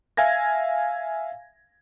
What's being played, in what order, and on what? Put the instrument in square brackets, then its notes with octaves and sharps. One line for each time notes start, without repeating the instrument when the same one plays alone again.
[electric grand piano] E5 F5 G#5 G#6 A#6